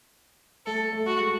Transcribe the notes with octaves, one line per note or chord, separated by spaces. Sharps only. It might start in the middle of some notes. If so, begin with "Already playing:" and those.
A3 A4
A3
F#4
G#3